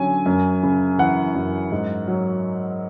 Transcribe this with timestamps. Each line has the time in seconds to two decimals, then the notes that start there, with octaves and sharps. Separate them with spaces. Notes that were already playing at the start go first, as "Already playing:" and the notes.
Already playing: D3 F#3 C#4 G#5
0.26 F#2
0.63 C#3
0.99 E3 F#5
1.35 F#2
1.72 G#2
2.07 F#3